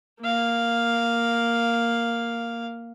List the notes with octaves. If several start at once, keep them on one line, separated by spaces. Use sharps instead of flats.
A#3 F5